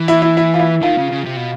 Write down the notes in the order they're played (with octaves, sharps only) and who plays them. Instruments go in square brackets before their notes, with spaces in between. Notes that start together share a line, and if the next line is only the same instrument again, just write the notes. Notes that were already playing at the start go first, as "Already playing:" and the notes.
Already playing: [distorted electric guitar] E3
[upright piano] E4
E4
E4
F4
E4
[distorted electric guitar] D#3 [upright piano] F4
[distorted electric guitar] C#3
C#3
C3
B2